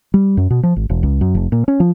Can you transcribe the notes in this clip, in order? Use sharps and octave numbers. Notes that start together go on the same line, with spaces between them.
G3
F#2
B2
F3
G#1
E1
C#2
F#2
F1
A#2
C#4
F3